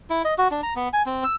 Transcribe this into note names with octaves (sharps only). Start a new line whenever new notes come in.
E4
D#5
F#4
D4
A#5
B3
G#5
C4
E6